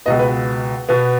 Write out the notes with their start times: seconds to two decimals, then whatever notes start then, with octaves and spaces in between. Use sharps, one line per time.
0.06 C#2 B2 B3 D#5
0.19 B4
0.89 B2 B3